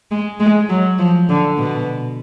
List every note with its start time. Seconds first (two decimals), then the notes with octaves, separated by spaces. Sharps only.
0.11 G#3
0.40 G#3
0.69 F#3
0.99 F3
1.29 D3
1.58 B2